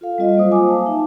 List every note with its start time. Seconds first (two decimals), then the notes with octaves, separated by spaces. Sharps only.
0.01 F4 A4 F5
0.18 G3 C4 F4 D#5
0.36 F#3 A#3 C5 D#6
0.52 G#5 D6
0.68 F5 A5
0.85 D#4 E5